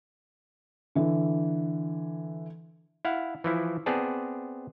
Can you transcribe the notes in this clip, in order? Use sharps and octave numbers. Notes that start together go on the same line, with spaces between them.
D3 E3
E4 F5 F#5
E3 F3 E4
B3 C4 G#4 D5 A5